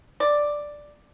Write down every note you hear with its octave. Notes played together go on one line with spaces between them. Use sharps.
D5